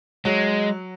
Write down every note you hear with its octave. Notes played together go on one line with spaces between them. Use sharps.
F#3 G#3